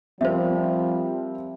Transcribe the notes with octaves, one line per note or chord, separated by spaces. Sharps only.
F3 G3 C4 A#4 C5 E5